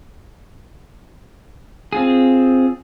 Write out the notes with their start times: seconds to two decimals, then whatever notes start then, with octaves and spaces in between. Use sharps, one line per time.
1.93 C4 F4 G#4